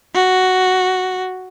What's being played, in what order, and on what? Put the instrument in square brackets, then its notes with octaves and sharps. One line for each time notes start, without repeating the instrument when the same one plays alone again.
[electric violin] F#4